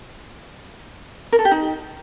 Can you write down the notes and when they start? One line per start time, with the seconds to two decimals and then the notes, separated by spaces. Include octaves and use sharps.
1.32 A#4
1.39 A4
1.45 G4
1.51 D#4